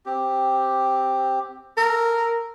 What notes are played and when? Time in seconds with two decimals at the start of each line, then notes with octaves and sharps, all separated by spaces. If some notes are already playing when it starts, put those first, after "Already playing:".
0.06 C4 G4
1.77 A4 A#4